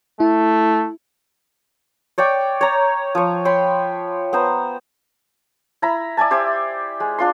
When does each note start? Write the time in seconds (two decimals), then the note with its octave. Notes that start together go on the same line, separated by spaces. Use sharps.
0.20 A3 E4
2.18 C#5 D5 G5 C#6
2.61 C#5 A#5
3.15 F3 C#5
3.45 C#5 G5 B5 C6
4.33 B3 C5 A#5
5.82 E4 A#5 B5
6.17 D5 E5 G#5 A5
6.31 G4 C5 E5 G#5
7.00 G#3
7.19 D4 F4 C6